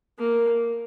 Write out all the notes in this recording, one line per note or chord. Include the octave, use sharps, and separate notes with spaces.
A#3